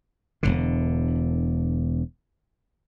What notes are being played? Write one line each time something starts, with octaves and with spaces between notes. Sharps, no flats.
E1 A#1 D3